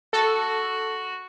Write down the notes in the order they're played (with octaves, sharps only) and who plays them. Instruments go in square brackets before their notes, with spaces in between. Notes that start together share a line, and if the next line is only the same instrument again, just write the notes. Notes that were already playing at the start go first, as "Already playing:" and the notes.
[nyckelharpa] F#4 [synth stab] A4